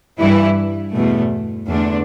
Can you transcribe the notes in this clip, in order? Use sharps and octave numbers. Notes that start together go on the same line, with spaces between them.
G2 E3 G3 E4
E2 B2 A3
E2 D3 A3 D4